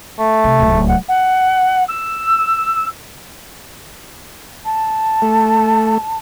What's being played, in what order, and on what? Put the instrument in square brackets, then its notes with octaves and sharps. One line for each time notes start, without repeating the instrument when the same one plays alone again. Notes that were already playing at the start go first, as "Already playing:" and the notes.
[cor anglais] A3
[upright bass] C3
D1 C#2
[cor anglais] F#5
[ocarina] F#5
E6
[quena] A5
[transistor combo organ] A3